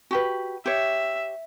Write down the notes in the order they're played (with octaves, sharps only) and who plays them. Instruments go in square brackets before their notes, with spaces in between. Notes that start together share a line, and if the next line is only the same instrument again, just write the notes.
[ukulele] F#4 G4 B4
[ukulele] G4 C#5 [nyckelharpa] E5